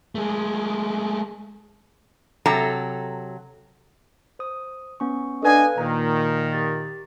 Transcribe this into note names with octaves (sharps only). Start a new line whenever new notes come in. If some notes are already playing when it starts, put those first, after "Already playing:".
G#3 A3
C3 F#3 A4 A#5
C5 D#6
B3 C#4 C#6
D4 A4 B4 D#5 F5 G#5
A#2 D#3 A#5
G4 A6